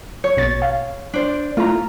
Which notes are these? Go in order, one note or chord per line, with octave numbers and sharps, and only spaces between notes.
C#5
A#1 B2 A6
F5
D4 C5 D5
A3 E4 F4 A#5